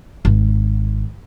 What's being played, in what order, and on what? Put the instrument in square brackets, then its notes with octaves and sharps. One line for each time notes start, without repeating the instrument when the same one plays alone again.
[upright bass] G#1